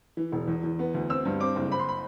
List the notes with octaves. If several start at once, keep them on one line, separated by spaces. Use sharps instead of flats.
E3
E1
E2
E2
B3
D2
C4 E6
G2
C4 D6
F#1
C4 B5
C6
B5